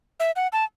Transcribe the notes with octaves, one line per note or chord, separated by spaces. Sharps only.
E5
F#5
A5